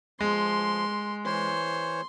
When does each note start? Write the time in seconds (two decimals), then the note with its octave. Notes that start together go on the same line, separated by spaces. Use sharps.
0.21 F3 G#3 C6
1.26 E3 C5 C#5 C6